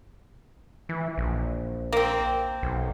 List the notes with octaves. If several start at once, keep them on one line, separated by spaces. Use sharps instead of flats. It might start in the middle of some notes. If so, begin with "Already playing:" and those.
E3
A#1
A#3 C4
B1